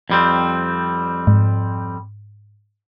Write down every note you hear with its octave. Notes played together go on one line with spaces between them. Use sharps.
F2 G3 C4
G#2